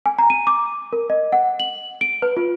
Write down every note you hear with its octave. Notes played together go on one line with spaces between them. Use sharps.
G#5
A#5
D#7
D6
A#4
D#5
F#5
F#7
D7
B4
F4